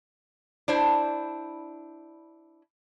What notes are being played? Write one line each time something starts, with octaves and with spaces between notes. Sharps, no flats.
D4 E4 C5